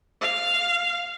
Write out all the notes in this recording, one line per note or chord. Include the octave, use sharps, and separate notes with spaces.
F5